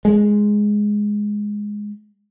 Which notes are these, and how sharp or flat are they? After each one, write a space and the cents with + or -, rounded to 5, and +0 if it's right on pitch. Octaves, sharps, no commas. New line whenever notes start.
G#3 +0